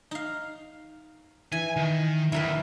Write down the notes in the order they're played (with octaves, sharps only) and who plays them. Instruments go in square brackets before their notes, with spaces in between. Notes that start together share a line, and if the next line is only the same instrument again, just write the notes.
[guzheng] D#4 F5
[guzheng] E3 [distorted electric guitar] G#5
[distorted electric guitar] D#3
[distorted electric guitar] D2 D#3 [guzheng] E4 A#4 B4